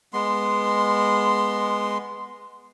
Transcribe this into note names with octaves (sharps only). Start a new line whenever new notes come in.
G#3 B3 C6